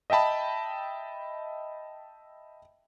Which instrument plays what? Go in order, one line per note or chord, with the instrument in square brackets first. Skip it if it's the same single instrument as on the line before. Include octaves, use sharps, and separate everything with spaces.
[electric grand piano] D#5 E5 G5 A5 B5